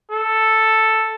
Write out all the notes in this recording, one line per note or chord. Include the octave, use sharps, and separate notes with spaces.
A4